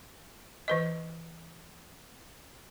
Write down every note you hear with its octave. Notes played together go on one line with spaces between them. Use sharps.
E3 B4 D#5